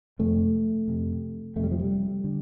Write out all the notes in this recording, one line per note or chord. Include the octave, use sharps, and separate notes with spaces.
F2 C3 A3
F2 C3
F2 C3 G3 A3
F3
G3
D3